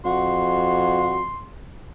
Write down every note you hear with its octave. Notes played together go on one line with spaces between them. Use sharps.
F2 F#4 C6